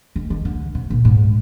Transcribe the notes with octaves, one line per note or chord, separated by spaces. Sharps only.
D#3
D#3
D3
C3
A#2
G#2